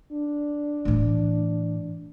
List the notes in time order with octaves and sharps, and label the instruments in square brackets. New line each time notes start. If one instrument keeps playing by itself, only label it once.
[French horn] D4
[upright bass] A2 E3